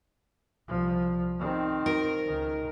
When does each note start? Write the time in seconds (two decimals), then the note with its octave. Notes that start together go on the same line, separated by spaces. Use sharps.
0.68 C2 F3
1.40 D#3 C4
1.86 A#4
2.26 C#2 D#3